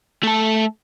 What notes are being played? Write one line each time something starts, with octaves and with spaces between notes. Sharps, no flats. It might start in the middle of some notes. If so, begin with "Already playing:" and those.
A3 A4